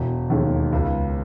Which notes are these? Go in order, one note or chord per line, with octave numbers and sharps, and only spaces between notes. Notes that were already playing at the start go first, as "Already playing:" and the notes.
Already playing: E1
D#2 D#3 G#3
C#2